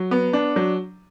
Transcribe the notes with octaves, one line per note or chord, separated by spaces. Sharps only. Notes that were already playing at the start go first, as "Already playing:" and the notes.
Already playing: F#3
B3
D4
F#3